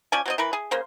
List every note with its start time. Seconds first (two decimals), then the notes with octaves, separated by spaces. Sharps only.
0.12 F3 C#4 D5 G#5
0.26 F#3 C4 D#5
0.38 E3 A#4 B4
0.53 G#4
0.71 C#3 A#3 C5